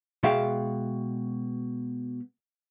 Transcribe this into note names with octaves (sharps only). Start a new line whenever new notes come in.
B2 G#3 F#4 E5 F5 G5